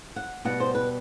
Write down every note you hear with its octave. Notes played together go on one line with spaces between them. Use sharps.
F#5
B2 G3 B3 F#5
C5
B4